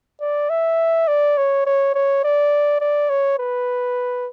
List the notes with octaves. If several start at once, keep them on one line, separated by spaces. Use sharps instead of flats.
D5
E5
D5
C#5
C#5
C#5
D5
D5
C#5
B4